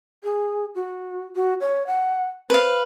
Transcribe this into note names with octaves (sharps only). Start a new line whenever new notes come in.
G#4
F#4
F#4
C#5
F#5
B4 C5 F5